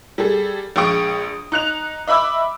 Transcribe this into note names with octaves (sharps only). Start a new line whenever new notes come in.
G3 G#4 A4
A#1 G#3 G5 C#6 D#6 D7
D#4 F#6 F7
D#5 E5 B5 D6 E6